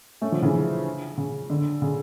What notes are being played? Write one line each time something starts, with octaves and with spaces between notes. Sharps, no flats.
A3 C#4
D3 F3
C#3 E3
C#3
D3
C#3